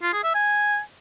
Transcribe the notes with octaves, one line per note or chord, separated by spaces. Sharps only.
F4
G#4
E5
G#5